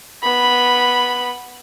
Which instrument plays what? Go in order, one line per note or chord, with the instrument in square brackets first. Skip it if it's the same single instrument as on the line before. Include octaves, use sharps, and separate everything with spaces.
[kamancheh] B3 B5